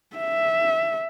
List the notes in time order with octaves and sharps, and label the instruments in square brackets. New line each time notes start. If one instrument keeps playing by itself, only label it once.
[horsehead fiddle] E5